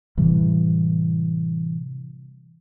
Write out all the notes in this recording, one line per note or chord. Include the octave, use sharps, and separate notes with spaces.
A2 C3 E3 G3